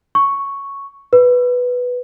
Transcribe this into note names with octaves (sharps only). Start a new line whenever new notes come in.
C#6
B4